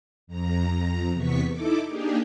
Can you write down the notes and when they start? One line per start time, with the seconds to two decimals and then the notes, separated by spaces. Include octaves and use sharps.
0.27 F2 A#5
1.13 E2 C3 B3 C#6 B6
1.50 D#4 E4 A4 D6
1.87 A#3 D4 D#4 G4 G#4